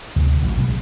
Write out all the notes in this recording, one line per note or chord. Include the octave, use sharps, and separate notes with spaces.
D2 C3
A1 G2 F#3
B1 B2 F3 G#3